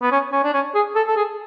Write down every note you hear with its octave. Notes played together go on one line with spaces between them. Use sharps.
B3
C#4
C#4
D4
C#4
G#4
A4
A4
G#4